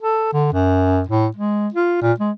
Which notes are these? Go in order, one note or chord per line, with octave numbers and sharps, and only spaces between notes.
A4
D3
F#2
A2
G#3
F4
A#2
G#3